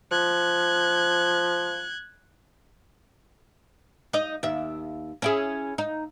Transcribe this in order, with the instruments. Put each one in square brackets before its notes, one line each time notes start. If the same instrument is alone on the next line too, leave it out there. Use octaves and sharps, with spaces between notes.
[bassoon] F3 [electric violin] F#6 G#6
[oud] D#4 D#5
D#2 E5
C#4 E4 G#4
D#4